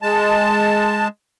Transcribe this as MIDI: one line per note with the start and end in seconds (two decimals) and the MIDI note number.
0.02 1.08 56
0.02 1.08 81